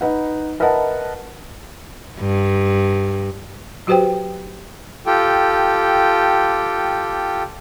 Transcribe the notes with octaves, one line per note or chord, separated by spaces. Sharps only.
D#4 B4 F#5
A#4 B4 D#5 E5 F#5 A5
G2
F#3 F#4 G4 B4 C5 G5
F4 G4 A4 G5